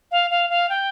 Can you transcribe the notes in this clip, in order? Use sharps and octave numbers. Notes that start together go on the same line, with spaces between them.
F5
F5
F5
G5